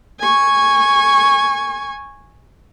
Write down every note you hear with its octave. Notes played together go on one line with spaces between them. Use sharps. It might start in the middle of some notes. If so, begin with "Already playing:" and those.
G#5 C#6